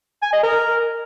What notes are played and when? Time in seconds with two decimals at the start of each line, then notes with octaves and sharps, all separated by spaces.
0.22 G#5
0.33 D#5
0.43 A#4